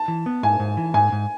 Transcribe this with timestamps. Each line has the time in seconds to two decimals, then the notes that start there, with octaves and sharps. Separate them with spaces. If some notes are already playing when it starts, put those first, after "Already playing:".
Already playing: A5
0.08 E3
0.26 B3
0.43 G#2 G#5
0.60 G#2
0.77 E3
0.94 G#2 G#5
1.12 G#2